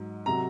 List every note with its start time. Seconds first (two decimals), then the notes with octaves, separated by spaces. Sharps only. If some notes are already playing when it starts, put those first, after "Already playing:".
Already playing: G#2 F#3
0.26 C3 F#3 A#5